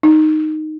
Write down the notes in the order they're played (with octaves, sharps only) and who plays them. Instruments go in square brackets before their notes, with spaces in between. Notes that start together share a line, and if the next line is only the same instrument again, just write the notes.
[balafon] D#4